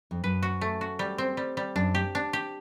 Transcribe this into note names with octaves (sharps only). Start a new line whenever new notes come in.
F2
F#2 B4
F#4
A3
F#4
G3
C4
G3
G3
F#2 D4
G4
D4
G4